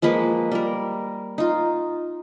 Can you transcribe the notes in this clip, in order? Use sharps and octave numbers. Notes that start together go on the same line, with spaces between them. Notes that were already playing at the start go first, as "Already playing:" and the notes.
F3 G#3 A#3 B4
G3 A#4
D#4 F4